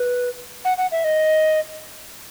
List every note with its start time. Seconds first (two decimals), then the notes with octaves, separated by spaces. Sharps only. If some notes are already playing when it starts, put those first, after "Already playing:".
Already playing: B4
0.65 F#5
0.78 F#5
0.92 E5
1.04 D#5